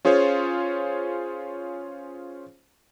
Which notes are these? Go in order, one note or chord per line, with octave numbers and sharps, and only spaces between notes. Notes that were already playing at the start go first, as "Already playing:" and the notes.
C#4 F4 G#4 C5 C#5